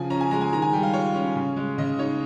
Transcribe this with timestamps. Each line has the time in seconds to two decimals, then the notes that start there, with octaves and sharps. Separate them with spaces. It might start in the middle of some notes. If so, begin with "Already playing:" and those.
Already playing: C#3 F3 G#5
0.10 C#4 A#5
0.21 G#5
0.31 G#3 A#5
0.41 G#5
0.53 D#3 A#5
0.62 G#5
0.73 G3 G5
0.83 F5
0.93 F4 C#5
1.14 C#4
1.36 C#3
1.56 G#3
1.78 C#3 D#5
1.99 D#4 C#5